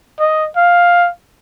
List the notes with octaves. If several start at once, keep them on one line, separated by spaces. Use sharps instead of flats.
D#5
F5